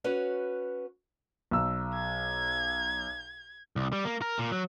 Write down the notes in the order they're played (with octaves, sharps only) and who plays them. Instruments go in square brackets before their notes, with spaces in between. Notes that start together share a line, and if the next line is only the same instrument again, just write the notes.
[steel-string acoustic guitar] C#4 F#4 B4 C#5
[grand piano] B1 E6
[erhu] G#6
[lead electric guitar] C2
G3
A#3
A#4
A#2
F#3